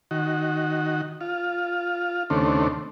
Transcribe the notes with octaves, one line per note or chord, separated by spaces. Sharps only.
D#3 F#4
F4
D#2 C#3 A3 C4 D4